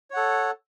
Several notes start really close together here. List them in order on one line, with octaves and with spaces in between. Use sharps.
C#5 F#5 A4